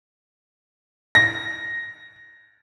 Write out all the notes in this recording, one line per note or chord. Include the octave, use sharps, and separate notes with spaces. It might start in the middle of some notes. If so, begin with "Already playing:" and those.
A#6